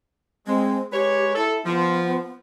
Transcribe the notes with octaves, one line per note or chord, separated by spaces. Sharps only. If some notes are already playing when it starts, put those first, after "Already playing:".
G#3 C4
G#3 G4 B4 C#5
E4 A4
F3 B3